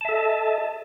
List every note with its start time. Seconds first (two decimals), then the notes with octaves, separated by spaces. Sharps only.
0.01 A5
0.05 E5
0.09 A4
0.13 D#5